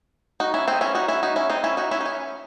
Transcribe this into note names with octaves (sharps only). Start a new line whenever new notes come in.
D#4 F#4
C#4 E4
C4 D#4
C#4 E4
D#4 F#4
C#4 E4
D#4 F#4
C#4 E4
C4 D#4
C#4 E4
D#4 F#4
C#4 E4
D#4
C#4